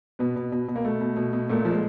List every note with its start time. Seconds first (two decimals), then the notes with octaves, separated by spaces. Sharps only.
0.19 B2 B3
0.36 B2
0.52 B2
0.68 B2
0.76 A#3
0.85 B2 A3
1.01 B2
1.17 B2
1.33 B2
1.49 A#2 A3
1.65 F3
1.71 G#3